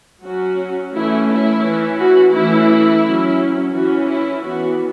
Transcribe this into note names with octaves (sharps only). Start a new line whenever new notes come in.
F#3 C#4 F#4
E3 A3 C#4 E4
E4
E3 C#4
F#4
E3 A3 C#4 E4
F#3 C#4
E3 C#4 F#4
E4
E3 B3 F#4